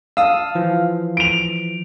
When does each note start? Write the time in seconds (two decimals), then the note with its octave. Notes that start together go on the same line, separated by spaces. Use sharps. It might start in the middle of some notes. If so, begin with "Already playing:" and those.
0.17 F5 A5 D#6 E6
0.55 E3 F3
1.17 D7 F7